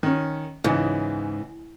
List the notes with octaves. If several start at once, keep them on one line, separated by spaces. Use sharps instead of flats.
D#3 C#4
C#2 G#2 C#3 E3